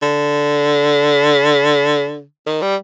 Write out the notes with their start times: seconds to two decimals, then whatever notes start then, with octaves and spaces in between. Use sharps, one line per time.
0.02 D3
2.47 D#3
2.62 G3